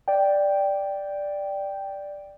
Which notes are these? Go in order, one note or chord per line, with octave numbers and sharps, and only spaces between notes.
D5 G5